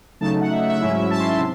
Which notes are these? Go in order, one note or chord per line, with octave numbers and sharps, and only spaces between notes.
C#3 F#3 A3 D#4 A5
F#5
E5
F#5
E5
G#2 F#3 C#4 E4
A5
C6
A5
C3